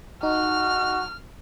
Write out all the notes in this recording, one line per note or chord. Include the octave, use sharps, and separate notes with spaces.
D#4 F#4 F6